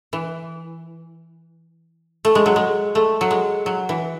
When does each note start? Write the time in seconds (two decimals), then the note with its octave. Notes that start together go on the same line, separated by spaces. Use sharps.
0.13 E3
2.25 A3
2.35 G#3
2.46 F#3
2.56 G#3
2.95 A3
3.21 F#3
3.31 G#3
3.66 F#3
3.89 E3